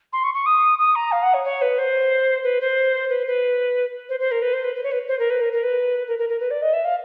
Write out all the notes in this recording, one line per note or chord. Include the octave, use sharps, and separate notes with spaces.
C6
C#6
C#6
D#6
D#6
A#5
F5
F#5
C#5
C#5
B4
C5
B4
C5
B4
B4
C5
C5
A#4
B4
C5
B4
B4
C#5
B4
C5
A#4
B4
A#4
A#4
B4
A#4
A#4
A#4
B4
D5
D#5
E5
F5